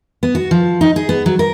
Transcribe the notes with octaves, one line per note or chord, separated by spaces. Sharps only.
B3
F#4
F3
D#4
G#4
B3
F#3
A#4